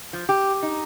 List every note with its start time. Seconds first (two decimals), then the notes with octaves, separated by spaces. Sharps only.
0.13 F3
0.29 G4
0.63 D#4